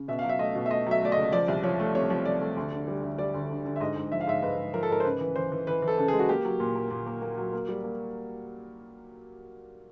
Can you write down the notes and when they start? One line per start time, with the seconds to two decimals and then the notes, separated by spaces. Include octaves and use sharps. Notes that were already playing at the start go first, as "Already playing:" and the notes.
Already playing: C#3
0.08 B2 E5
0.19 F5
0.24 F#3
0.29 E5
0.39 A3 D#5
0.55 B2
0.66 E5
0.71 A3 D#5
0.87 F#3 E5
1.02 A3 D5
1.12 C#2 D#5
1.32 F3 D5
1.48 C2
1.63 F3 C#5
1.80 A3
1.95 C3 C#5
2.10 F3
2.25 F3 D5
2.41 A3
2.57 D2
2.72 D3
2.88 G3
3.03 D2
3.18 G3 D5
3.34 D2
3.50 D3
3.65 D3
3.76 E5
3.80 G#2 D#5
3.96 G#2
4.12 F3 E5
4.21 F5
4.27 G#2 E5
4.42 G#2 B4
4.58 G#2
4.74 F3 A#4
4.83 A4
4.89 G#2 A#4
5.00 C5
5.04 C#3 B4
5.21 E3
5.36 E3 C5
5.52 E3
5.67 E3 B4
5.82 E3
5.88 A4
5.98 C#3 A4
6.08 G#3 G#4
6.19 F#4
6.29 A#3 G4
6.45 F#3
6.60 A#2
6.75 A#3
6.91 A#2
7.07 A#3
7.22 A#3
7.38 F#3
7.53 A#3
7.69 G3
7.84 A#3